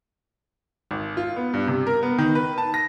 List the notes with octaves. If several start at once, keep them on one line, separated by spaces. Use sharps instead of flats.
G#1
F4
B3
G2
C3
A#4
B3
D#3
B4
A5
A#6